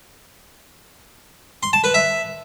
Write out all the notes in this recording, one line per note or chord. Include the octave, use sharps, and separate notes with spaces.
C6
A5
B4
E5